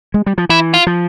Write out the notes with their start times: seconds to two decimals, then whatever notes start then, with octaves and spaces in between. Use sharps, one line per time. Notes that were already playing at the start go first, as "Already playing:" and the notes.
0.14 G#3
0.26 G3
0.38 F3
0.49 E3 E4
0.74 F4
0.87 F3